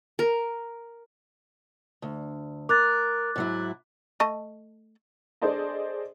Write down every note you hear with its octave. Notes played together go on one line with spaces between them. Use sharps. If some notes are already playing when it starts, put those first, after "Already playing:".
A#4
D2
A#4 D6 F#6 A6
G#2 F#3 E4
A3 D#5 A5
D4 G#4 A4 C5 D5 D#5